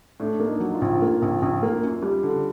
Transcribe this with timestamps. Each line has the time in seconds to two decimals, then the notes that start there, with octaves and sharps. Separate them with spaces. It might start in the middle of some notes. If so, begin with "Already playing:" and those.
0.20 A2 D4
0.40 A#3 D4
0.47 D#4
0.60 F#3
0.74 F4
0.82 A#1
1.02 A#3
1.22 A#1
1.42 A#1
1.63 A#3
1.83 F#2
2.03 G3
2.23 D3